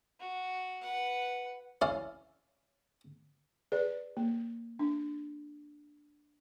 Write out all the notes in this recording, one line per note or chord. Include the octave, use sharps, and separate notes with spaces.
F#4
B4 F#5
C#4 E4 D5 F5
G#4 B4 D5
A#3
D4